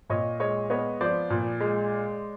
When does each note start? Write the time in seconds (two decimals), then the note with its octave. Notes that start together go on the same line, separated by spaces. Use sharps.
0.10 A#2 C#5 D#5
0.40 G#3 C#5 D#5
0.70 B3 C#5 D#5
1.01 F3 C5 D5
1.30 A#2
1.60 G#3